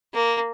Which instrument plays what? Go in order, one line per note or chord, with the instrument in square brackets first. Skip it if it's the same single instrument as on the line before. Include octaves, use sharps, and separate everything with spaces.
[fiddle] A#3